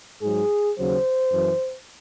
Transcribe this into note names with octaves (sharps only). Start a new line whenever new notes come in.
G#2 F#3 G#4
D#2 C#3 F#3 C5
F#2 E3